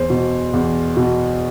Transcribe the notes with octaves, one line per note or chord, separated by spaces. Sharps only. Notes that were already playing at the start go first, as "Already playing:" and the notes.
Already playing: E2 C5
B2
E2
B2